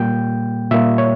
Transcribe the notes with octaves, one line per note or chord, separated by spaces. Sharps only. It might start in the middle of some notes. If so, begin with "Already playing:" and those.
Already playing: A#2 G3 A#3 G5
A#2 G3 A#3 E5
C#5